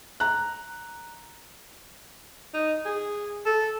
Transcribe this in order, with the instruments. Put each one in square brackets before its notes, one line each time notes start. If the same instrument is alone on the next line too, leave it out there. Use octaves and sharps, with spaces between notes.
[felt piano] A#5 F#6
[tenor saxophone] D#4
G#4
A4